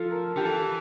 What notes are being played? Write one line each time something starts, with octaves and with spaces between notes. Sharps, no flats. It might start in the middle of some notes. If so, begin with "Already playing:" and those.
Already playing: F3 F4 A4
A#4
D3 G4
E3 A4